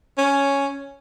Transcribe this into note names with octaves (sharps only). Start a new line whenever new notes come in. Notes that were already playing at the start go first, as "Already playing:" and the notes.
C#4